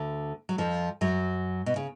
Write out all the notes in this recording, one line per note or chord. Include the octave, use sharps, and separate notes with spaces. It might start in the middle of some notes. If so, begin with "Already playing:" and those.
Already playing: D2 D3
F#3
F2 F3
F#2 F#3
B2
C#3